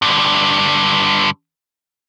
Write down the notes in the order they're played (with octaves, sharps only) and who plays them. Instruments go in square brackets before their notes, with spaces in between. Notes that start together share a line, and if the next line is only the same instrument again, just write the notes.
[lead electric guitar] G2 D3